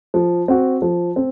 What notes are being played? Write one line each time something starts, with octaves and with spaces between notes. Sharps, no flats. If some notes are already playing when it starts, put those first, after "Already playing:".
F3
C4 F#4
F3
C4